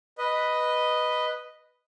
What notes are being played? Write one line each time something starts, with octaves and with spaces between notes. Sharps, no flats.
B4 D#5